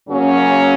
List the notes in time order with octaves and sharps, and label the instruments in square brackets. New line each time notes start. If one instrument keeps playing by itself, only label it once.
[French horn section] F#2 C#3 F#3 A#3 C#4